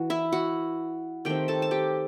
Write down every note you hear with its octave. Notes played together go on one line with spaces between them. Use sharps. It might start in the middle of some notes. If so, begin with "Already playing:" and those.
Already playing: E3 F#4
E4 E5
F#4 F#5
D#3 A3 C4 G4 G5
A4 A5
A5
G4 G5